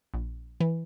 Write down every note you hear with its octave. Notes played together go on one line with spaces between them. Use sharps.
A#1
E3